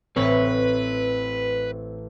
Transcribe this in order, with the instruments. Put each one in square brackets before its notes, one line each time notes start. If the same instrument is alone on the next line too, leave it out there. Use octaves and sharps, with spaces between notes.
[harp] A1 A2 [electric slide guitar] C4 C#5 [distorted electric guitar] B4